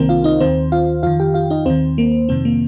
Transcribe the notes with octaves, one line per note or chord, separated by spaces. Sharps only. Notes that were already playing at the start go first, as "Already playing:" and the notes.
Already playing: C2 C3 D#3 A#3 C4 A#4 C5
F4 F5
D#4 D#5
D#2 D#3 C4 C5
F4 F5
F2 D#3 F4 F5
G4 G5
F4 F5
D#4 D#5
D#2 D#3 C4 C5
A#3
F2 C3 D#3 C4
A#3